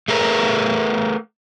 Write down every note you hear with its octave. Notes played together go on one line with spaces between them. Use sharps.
A3 G#4 A#4 B4